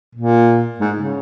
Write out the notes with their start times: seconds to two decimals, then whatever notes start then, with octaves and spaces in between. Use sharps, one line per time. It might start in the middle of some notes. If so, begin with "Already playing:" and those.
0.15 A#2
0.80 G#2
0.96 C#3